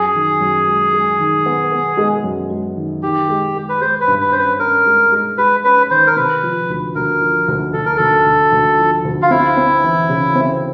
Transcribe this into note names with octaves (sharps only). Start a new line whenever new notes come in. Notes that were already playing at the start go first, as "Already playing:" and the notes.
Already playing: F#2 G#4
D#3
F#2
G#3
G#3
D#3
B3
B3
G#3
F#2
G#3
D#3
D#3 G4
G#3
G#3
B4
G#3 C5
B4
G2
B4
C#4 C5
B4
C#4 A#4
G#3
G#3
G#3 B4
C#4 B4
D#3 C5
A#4
C3 B4
F3
D2
D2 A#4
F3
D2
D2 A4
A#4
D2 A4
D2
D2
F3
D2
F4
C4 E4
C4
E3
C#3
C4